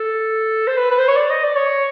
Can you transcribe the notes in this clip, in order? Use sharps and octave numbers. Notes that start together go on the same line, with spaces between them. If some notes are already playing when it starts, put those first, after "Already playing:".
Already playing: A4
C5
B4
B4
C5
C#5
D5
D#5
D5
C#5